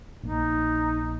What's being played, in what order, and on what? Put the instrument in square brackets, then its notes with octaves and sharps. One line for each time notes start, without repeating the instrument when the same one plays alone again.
[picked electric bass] A#1 A#3 [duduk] D#4